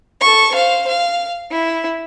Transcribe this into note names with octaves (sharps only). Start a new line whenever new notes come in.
A4 C#6
C5 F5
F5
E4